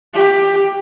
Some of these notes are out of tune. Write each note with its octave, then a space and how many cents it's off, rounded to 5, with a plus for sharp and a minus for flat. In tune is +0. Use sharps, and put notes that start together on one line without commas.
G4 +15